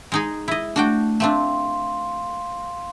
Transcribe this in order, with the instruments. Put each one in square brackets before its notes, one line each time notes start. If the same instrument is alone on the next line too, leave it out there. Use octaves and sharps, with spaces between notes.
[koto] G#3 D#4 G#4
E4 D#5
[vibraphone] A3 [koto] D4 F#4 G5
[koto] A3 C4 D4 [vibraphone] F5 C6